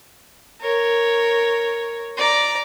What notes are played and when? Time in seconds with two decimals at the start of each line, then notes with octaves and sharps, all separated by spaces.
0.61 A#4 C#5
2.17 D5 A#5